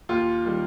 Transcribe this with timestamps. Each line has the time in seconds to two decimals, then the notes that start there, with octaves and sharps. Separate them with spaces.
0.09 D#2 F4
0.45 D#3 G3